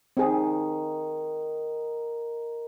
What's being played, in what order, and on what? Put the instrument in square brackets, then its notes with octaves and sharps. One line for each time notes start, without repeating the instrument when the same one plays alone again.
[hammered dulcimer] D#3 [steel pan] C4 G#4